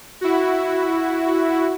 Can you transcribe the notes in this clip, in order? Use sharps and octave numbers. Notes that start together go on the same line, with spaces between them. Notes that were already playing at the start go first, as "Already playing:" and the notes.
E4 F#4